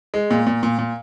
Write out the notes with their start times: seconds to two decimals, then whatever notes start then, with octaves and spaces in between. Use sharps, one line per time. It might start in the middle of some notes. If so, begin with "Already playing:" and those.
0.14 G#3
0.31 A#2
0.47 A#2
0.63 A#2
0.79 A#2